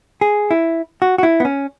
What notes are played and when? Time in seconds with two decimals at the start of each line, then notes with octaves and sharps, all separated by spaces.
0.21 G#4
0.51 E4
1.02 F#4
1.18 F#4
1.23 E4
1.40 B3
1.45 C#4